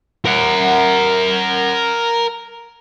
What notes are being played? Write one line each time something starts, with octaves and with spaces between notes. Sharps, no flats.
A#4 F#5